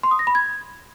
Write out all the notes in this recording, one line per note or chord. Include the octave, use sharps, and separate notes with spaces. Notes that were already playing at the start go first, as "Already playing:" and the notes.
C6
D#6
A#6
B5
G#6